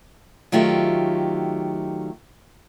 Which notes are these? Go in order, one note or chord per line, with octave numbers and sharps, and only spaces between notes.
D#3 F#3 A3 F4 G4